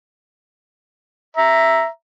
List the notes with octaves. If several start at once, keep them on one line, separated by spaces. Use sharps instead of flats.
E5 A#5